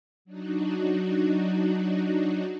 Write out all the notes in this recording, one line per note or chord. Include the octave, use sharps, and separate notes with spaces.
F#3 D4 D#4 F#4